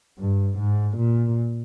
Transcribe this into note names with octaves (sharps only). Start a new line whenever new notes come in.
G2
G#2
A#2